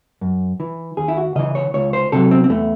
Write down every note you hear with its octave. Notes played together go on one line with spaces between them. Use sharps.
F#2
E3
D#2 G#4
E4
F#4
C#3 E3 D#5
C#5
C#2 C#5
C5
C3 D#3 F#3 A4
C4
C4
E2 A3